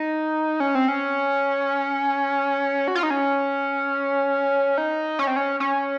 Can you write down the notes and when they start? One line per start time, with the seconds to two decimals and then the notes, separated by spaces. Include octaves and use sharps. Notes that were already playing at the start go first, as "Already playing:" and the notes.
Already playing: D#4
0.60 C#4
0.75 C4
0.88 C#4
2.88 F#4
2.95 F4
3.03 D#4
3.10 C#4
4.78 D#4
5.19 C#4
5.27 C4
5.36 C#4
5.60 C#4